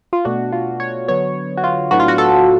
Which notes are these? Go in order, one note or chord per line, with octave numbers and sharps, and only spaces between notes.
F4
B2 A3 D4 F#4
F4
C#5
D3 F#3 B3 C#5
F#4
F4
A2 F#3 B3 D4 F#4
F4
F#4
A4